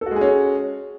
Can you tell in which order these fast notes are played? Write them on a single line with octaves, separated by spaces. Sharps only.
A4 F#4 G#3 G#4 C#4